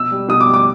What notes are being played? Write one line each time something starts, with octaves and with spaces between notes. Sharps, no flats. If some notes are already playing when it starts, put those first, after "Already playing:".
Already playing: B2 E6
G3
B2 D#6
D6
G3
D6